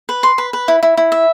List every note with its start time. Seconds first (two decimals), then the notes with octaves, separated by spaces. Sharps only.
0.09 B4
0.23 C6
0.38 B4
0.53 B4
0.68 E4
0.83 E4
0.97 E4
1.12 E5